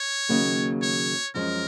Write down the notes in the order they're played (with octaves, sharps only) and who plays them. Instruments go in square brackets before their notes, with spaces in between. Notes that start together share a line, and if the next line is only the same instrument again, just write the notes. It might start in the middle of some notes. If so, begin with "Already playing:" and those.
Already playing: [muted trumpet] C#5
[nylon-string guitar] D#2 C#3 F#3 A#3
[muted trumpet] C#5
[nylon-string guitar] F#2 F3 G#3 C#4 [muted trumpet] A#4